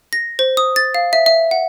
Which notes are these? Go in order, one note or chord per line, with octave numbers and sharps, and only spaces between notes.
A#6
C5
D#6
A6
F5
E5
E5
F#5